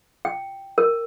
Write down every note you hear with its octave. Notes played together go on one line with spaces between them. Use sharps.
G5
A#4